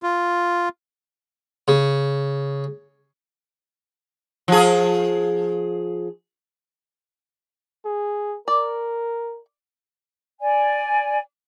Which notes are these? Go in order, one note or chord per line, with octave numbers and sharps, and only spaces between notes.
F4
C#3
F3 G#4
G#4
A#4 D5
D5 G#5